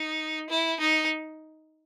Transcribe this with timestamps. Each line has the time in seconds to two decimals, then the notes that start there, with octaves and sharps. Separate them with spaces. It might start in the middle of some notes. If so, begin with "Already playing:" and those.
Already playing: D#4
0.50 E4
0.80 D#4